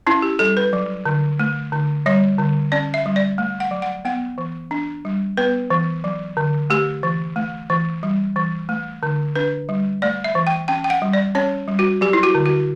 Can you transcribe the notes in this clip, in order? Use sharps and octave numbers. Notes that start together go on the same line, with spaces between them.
C#4 E4
G4
G3 A4
B4
F#3
D3
A3
D3
G3 C#5
D3
C#4 D5
E5
G3
D5
A3
F#5
F#3
F#5
B3 F#5
E3
D4
G3
B3 B4
E3
F#3
D3
A3 G4
E3
A3
E3
G3
E3
A3
D3
D4 B4
G3
A3 D5
E5
E3
G5
C#4 G5
G5
F#5
G3
D5
C#4 C#5
G3
F#4
F#3 G4
E4
F#4
D3
F#4